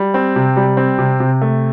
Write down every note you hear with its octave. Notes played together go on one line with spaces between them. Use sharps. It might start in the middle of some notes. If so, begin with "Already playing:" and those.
Already playing: G3
C4
C3
G3
C4
C3
C3
A3